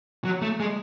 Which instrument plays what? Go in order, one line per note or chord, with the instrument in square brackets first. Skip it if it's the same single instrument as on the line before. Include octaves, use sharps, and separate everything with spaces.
[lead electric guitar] F#3
A3
G#3